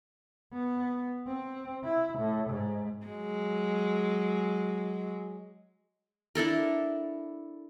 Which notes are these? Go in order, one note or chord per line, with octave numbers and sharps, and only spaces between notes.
B3
C4
E4
A2
G#2
F#3 G#3
D4 E4 A4 A#4